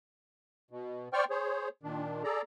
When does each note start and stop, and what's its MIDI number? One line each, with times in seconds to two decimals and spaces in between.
0.71 1.08 47
1.13 1.25 72
1.13 1.25 74
1.13 1.25 79
1.13 1.25 85
1.13 1.25 89
1.30 1.69 68
1.30 1.69 72
1.30 1.69 73
1.83 2.23 46
1.83 2.23 51
1.83 2.23 62
2.24 2.42 68
2.24 2.42 69
2.24 2.42 74
2.24 2.42 82